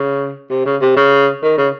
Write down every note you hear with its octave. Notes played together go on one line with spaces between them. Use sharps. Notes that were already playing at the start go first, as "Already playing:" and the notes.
Already playing: C#3
C3
C#3
C3
C#3
D#3
C#3